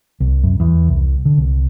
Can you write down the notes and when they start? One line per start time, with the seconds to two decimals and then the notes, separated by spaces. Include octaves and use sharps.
0.20 C2
0.43 F#2
0.60 E2
0.88 C2
1.25 D3
1.38 C2